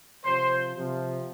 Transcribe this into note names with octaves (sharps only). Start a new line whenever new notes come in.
C3 F3 C5
C3 F3